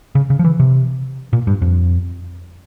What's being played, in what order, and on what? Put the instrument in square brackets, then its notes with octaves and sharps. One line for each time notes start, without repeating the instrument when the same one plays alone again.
[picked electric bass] C#3
C#3
F3
E3
C3
A#2
G2
F2